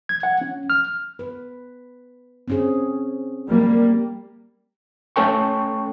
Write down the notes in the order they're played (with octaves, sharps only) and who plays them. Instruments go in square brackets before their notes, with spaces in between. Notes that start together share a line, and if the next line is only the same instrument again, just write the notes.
[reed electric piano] G#6
F#5
C#4
F6
[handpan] B4
C4 C#4 G#4
[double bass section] G3 A#3
[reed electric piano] A3 C#4 A4 G5 C#6